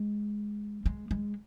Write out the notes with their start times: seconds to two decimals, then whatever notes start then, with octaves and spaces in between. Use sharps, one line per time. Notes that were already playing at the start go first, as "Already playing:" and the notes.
Already playing: G#3
0.86 G#3
1.11 G#3